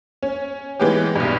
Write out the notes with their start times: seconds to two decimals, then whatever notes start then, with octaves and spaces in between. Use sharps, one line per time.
0.22 C#4
0.80 E3 G#3 B3 C#4 G4
1.16 B1 G2